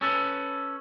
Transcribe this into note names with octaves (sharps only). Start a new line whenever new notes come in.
C#4 A4 B4